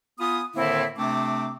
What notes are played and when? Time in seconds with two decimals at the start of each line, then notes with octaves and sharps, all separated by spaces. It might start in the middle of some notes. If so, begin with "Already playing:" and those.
0.19 B3 F4 G#5 D#6
0.56 A2 D3 D#3 A#3 C4 E4
0.97 C3 A3 C4 D4 D6